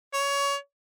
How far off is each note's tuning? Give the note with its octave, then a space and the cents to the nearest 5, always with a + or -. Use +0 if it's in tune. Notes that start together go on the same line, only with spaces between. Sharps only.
C#5 +20